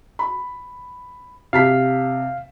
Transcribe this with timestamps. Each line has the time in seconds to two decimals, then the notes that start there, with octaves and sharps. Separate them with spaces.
0.19 B5
1.53 C3 F5 A5 B6